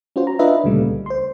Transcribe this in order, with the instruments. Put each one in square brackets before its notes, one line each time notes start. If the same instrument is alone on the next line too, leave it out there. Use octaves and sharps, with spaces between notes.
[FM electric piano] C#4 F4 F#4 C5
A#5
D4 F4 B4 D#5 E5
D2 A#2 C#3 G3 A3
C#2
C5 C6